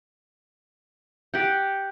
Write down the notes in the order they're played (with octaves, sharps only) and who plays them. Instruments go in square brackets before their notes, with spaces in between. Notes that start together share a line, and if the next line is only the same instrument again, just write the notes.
[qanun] G4 F#5 [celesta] G6